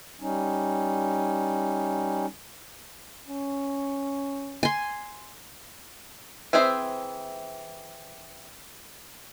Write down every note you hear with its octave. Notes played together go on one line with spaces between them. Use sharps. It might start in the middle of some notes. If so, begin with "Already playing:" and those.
G3 C#4 D#4
C#4
G#5 C6
E3 C4 G#4 C5 E5